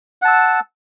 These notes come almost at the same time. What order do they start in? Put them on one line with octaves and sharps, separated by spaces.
F#5 A5 E6